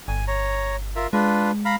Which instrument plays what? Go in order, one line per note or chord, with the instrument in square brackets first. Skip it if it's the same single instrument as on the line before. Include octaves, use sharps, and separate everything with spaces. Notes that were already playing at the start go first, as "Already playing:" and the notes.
[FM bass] G1 [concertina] G#5
[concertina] C#5 A#5
F4 A#4 E5
[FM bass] G#3 [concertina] D4 F4 B4
[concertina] F5 A#5 B5